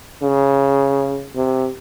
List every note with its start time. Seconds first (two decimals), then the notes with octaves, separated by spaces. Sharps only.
0.22 C#3
1.35 C3